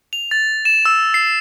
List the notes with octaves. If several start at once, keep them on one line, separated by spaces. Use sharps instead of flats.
F7
A6
E7
E6
C7